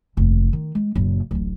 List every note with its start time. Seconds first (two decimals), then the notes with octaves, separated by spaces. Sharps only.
0.17 F1 D#2
0.53 D#3
0.75 G#3
0.95 F#1 A#2
1.31 D1 A1